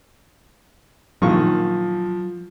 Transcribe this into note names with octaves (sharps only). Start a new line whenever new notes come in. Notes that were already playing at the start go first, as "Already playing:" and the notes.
A#1 D#3 F3 F#3 C#6